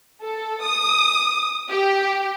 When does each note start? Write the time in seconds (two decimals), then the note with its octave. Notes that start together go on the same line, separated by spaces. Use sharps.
0.22 A4
0.63 D#6
1.70 G4